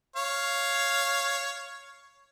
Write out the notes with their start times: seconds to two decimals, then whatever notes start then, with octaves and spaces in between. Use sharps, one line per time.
0.16 C#5 F5